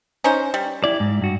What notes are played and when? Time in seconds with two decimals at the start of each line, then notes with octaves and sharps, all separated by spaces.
0.24 C#4 D#4 C5
0.54 G3
0.84 E4 D5
1.00 G#2
1.22 G2 F#4